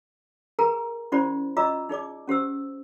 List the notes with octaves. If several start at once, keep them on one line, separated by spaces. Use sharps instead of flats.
G#4 A#4 B4 G#5 A#5
C#4 E4 G4 C5 D5 B5
F4 D5 D#5 A#5 D6 E6
D#4 G#4 D5 D6
C#4 G4 C5 E6